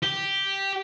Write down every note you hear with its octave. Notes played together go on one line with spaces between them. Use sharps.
G4